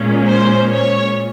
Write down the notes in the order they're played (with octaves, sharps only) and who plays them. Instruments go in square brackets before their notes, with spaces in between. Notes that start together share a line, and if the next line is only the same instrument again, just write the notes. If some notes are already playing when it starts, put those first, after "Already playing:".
Already playing: [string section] A#2 G#3 C#4
C5
C#5